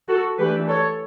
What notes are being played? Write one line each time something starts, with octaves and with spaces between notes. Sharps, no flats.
F#4 A4
E3 A3 D4 G4 B4
A4 C#5